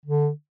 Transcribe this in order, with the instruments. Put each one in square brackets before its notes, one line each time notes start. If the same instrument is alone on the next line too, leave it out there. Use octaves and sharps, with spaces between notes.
[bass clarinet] D3